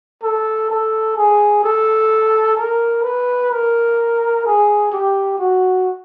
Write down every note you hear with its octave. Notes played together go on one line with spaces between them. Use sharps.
A4
A4
G#4
A4
A#4
B4
A#4
G#4
G4
F#4